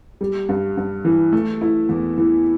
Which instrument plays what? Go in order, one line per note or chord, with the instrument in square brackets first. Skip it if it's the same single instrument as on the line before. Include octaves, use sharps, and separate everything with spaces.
[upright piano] G3
G2
G2
E3
A3
E4
E2
E3